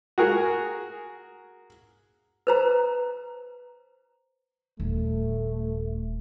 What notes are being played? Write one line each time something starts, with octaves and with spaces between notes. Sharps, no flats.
F#4 G#4 A#4
B4 C5 A#5
D#1 A3